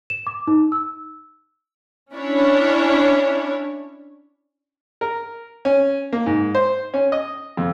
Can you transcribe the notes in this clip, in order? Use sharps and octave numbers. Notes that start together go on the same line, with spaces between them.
E7
D6
D#4
E6
C#4 D4 E4 C#5
A#4
C#4
A#3
G#2
C5
C#4
D#5
F2